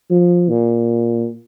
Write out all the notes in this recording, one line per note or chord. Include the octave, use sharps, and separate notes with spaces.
F3
A#2